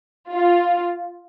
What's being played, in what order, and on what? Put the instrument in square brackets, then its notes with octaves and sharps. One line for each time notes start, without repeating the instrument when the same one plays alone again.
[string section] F4